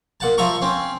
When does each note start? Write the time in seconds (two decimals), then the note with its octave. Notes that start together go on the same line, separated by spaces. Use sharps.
0.20 A#2 F#5 A5
0.38 F3 E5 A#5 C#6
0.62 C4 C#4